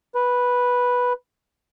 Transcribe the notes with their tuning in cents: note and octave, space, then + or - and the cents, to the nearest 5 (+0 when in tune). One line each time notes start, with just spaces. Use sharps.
B4 -5